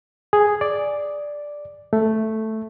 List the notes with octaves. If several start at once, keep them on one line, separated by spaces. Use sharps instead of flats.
G#4
D5
A3